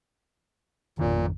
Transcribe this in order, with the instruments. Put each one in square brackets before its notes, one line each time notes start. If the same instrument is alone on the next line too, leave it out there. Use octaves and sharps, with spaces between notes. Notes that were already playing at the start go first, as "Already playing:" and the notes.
[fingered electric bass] G#1 F2 D#3 [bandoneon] A#2